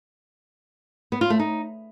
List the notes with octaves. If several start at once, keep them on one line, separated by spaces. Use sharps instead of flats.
B3
F4
A3
D#4